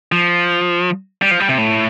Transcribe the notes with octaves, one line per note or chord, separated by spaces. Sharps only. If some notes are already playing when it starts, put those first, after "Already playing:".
F3
G3
F3
G3
C3
A2